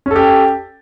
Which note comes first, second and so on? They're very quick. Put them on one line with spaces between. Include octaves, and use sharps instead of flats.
C#4 A4 G4